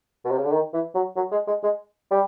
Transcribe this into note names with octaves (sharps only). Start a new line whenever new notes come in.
B2
C3
C#3
D3
D#3
E3
F#3
F#3
G#3
G#3
G#3
G3